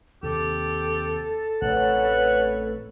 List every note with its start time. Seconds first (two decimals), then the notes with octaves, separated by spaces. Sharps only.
0.23 D#2 C3 G4 A4
1.62 A1 C3 A3 B4 C#5 F#5